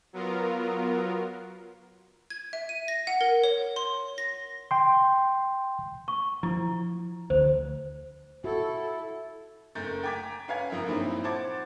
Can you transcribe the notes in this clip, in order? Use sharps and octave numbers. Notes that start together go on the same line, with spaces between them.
F#3 B3 F4 A#4
G#6
E5
D#7
A#6
F#5
A#4
C#5
C6
A#6
G5 C6
C#6
F3 E4
D2 C5
E4 F#4 A4
F#1 A3 A#4 G6 A6
G5 G#5 A#5 D6 G#6 B6
C#4 B4 F5 G#5 A#5 G#6
F#1 F3 A#4 E5
G2 A#2 F3 C4 D#4 E4
C5 F#5 A5 D6 G#6 A6